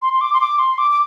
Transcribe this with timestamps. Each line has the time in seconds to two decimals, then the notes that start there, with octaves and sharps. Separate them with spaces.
0.02 C6
0.13 C6
0.21 D6
0.33 C6
0.41 D6
0.59 C6
0.78 D6
0.91 D6